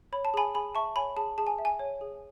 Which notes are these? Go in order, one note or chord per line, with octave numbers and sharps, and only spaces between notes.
C#5 B5
A5
G#4 G#5 B5
G#4 G#5 B5
E5 A5 C#6
C#5 G#5 B5
G#4 A5
G#4 A5
G#5
E5
G#5
C#5
G#4